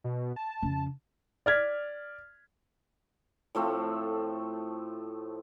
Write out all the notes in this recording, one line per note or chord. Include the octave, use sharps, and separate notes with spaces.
B2
A5
F2 C#3
D5 F6 G#6 B6
A2 F3 A3 C4